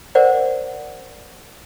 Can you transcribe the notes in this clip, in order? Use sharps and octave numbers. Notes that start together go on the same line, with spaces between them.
A#4 C5 D5 F#5